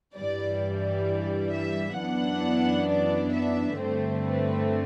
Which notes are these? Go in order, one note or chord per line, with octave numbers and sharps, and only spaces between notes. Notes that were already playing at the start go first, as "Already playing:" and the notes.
G2 E3 G3 D5
D5
E5
F#2 E3 B3 D4 F#5
D5
E5
G2 D3 A3 C4 C5
B4